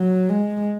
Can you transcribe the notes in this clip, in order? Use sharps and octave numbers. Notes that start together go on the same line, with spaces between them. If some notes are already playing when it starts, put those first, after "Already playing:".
Already playing: F#3
G#3